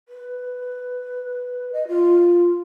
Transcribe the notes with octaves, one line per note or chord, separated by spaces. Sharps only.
B4
D#5
F4